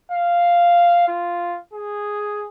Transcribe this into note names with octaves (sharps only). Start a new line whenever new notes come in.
F5
F4
G#4